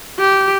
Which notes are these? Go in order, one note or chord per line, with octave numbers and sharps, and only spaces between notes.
G4